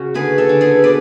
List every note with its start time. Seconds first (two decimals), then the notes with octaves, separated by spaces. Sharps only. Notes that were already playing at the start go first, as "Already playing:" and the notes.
Already playing: C#3 F#4
0.14 D3 G#4 B4
0.38 A4 C#5
0.49 D3
0.61 G#4 B4
0.84 B2 B4 D5